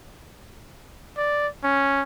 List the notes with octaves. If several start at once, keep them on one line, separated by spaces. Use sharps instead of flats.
D5
C#4